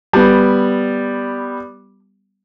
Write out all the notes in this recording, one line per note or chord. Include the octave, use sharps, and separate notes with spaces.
G3 B3